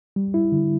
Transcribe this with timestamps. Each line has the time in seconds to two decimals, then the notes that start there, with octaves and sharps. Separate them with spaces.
0.16 G3
0.34 E4
0.52 D3